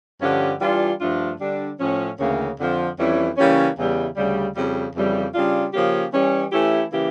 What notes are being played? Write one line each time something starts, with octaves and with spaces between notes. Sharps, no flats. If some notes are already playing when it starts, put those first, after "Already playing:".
G2 D3 F3 C#4 G4
E3 G3 D4 F4
G2 F3 A3 D4 F4
D3 G3 D4
A2 F3 C#4
D2 C#3 E3 A#3 C#4
F2 D3 F3
F2 E3 G3 C#4 E4
C#3 E3 G3 A#3 C#4
E2 C#3 E3 G3
D2 C#3 G3
F2 C#3 G3
F2 C#3 E3 G3
C#3 G3 D4 F4
C#3 F3 A#3 C#4 G4
E3 G3 C#4
E3 A3 C#4 E4 G4
C#3 E3 A#3 E4 G4